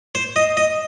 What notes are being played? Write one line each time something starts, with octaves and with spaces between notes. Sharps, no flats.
C5
D#5
D#5